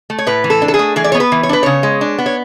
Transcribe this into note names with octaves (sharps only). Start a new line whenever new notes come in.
A3
C#5
A2 B4
E3
A4
D4
A4
G#4
A3
E3 G#4
D5
B3 C#5
B4
E3
C#5
D4 B4
C#3 C#5
G#3
D4
B3
C#5